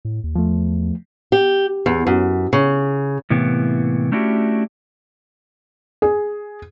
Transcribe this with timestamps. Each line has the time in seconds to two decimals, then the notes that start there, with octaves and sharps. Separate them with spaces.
0.05 A2
0.24 D#2
0.35 E2 F3 A3
1.32 G4
1.86 E2
2.07 F#2
2.53 C#3
3.30 A2 C3 E3 A#3 B3
4.12 A3 C#4 D4 E4 F#4 G4
6.02 G#4